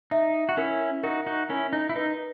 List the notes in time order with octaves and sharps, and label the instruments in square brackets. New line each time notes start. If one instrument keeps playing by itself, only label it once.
[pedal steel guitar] D#4 [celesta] E5
[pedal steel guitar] F#4
[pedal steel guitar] C#4 E4 [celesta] A#4
[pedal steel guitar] D#4 F#4 [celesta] A#4
[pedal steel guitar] D#4 F#4
[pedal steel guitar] C#4 E4 [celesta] A#4
[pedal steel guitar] D#4
E4
[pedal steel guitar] D#4 [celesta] B4